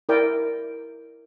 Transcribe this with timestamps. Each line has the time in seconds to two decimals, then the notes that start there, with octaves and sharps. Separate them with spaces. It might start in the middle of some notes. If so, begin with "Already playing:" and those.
0.09 E4 A#4 D5 G5